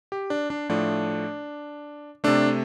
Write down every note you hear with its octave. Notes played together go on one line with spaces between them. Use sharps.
G4
D4
D4
A2 F3 A3 D4
C3 A3 D4